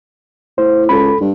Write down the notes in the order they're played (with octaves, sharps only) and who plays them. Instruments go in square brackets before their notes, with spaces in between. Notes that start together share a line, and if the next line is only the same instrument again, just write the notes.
[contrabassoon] A2 [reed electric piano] C5
[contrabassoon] C#2 [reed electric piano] A4 B5
[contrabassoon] G2